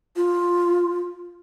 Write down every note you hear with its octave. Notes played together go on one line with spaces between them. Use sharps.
F4